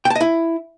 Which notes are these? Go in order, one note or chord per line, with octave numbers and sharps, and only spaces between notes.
G5
A5
D#5
E4